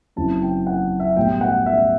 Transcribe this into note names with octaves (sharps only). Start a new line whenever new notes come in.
F#1 F#2 F#3 C4 E4 A5
G5
F#5
E5
B1 A2 G3 G5
F#5
E5